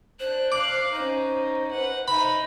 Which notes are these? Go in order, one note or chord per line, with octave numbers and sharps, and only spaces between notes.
D4 C5 F#6
F5 D6 F#6
C#4 D#4 C5
B4 F#5
D#4 E5 B5